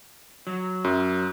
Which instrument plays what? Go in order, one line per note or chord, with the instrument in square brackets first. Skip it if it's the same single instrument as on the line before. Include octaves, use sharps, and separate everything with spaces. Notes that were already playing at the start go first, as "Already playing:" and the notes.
[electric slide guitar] F#3
[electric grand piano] F#2